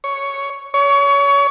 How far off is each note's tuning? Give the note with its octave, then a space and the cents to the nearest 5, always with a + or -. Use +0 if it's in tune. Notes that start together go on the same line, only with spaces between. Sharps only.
C#5 +0
C#5 +25